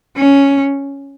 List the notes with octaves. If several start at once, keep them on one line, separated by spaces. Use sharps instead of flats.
C#4